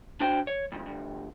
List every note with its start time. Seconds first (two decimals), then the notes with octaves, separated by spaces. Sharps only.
0.20 D4 F#4 C5 G5
0.47 C#5
0.72 F2 G#2
0.86 D2 G2